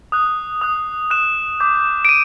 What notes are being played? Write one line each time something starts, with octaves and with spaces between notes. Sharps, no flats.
D#6 F#6
D#6 F#6
D#6 F#6 E7
D6 G6
D7
D#7